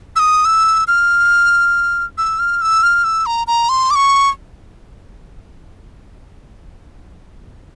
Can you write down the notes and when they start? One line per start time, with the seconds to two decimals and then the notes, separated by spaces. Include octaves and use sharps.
0.16 E6
0.19 D#6
0.45 E6
0.87 F6
2.18 E6
2.39 F6
2.61 E6
2.83 F6
3.04 E6
3.26 A#5
3.47 A#5
3.69 C6
3.90 D6
3.95 C#6